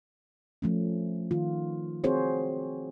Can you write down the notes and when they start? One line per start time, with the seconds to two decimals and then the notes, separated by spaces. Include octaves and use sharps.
0.62 F3 A3 C#4
1.31 D#3 F4
2.04 C4 F#4 G#4 C5 C#5